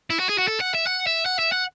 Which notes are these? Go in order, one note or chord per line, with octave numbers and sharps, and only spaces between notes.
E4
F#4
G#4
F#4
A4
F#5
E5
F#5
E5
F#5
E5
F#5